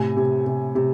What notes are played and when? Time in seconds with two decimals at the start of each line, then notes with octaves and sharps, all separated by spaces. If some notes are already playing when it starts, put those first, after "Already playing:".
Already playing: A2 C3 G#5
0.16 C3
0.46 C3
0.75 C3